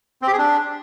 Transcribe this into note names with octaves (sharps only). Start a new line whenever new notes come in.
C4
G4
G#4
D4